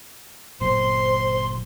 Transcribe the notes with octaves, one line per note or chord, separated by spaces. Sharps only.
G1 A#2 F#3 C5 C6